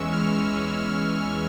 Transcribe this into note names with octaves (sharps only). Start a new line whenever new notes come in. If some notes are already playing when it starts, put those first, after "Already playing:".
Already playing: E2 E3 G#3 C#4 C#6 E6
F6
E6
E3 G#3 C#4 C#6